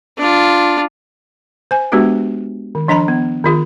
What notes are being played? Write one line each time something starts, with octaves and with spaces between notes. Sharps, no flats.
D4 F4
C5 G#5
G#3 B3 D4 F#4 G4 B4
D#3
F3 D4 D#5 A#5 B5
B3
D#3 F4 G#4